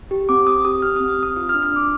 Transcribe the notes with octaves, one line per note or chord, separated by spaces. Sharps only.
G4
C4 D6
C4 D#6
G4 D#6
G4 F6
D#6
C4
F6
C4
D#6
F4 D#6
F6
D4
F6
D4 D6